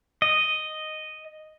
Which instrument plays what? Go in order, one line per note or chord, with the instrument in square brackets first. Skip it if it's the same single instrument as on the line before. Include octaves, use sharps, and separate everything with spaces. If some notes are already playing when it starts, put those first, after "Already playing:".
[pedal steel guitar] D#5